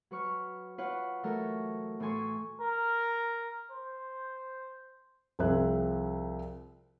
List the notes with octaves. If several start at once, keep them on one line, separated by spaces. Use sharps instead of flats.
F#3 B4 C#6 F6
F4 B4 C#5 F#5
E3 F#3 A3 A4 A#4
A2 E3 A4 G#5 C6 C#6
A#4
C5
C2 F3 C4 G#4 E5 F#6